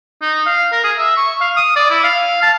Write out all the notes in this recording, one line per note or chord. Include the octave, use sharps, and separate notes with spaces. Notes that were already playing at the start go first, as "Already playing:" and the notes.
D#4
F5
A#4
G#4
E5
C#6
F5
D#6
D5
E4
F5
A5